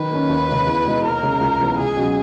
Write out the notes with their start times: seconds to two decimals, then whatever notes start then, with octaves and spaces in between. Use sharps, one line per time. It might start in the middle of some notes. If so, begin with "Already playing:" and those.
Already playing: D#3 B4
0.11 A#3 C#4
0.29 D#2
0.48 C#3 G#3 D#4
0.67 E2
0.85 B2 G#3 D#4
1.04 D#2 A#4
1.22 C#3 G#3 D#4
1.41 C#2
1.59 C#3 E3 G#3 B3
1.78 C#2 G#4
1.96 B2 F#3 C#4